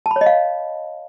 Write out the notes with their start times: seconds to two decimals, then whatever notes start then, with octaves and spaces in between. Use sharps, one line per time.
0.06 A5
0.11 B5
0.16 C#5
0.21 D#5
0.26 F5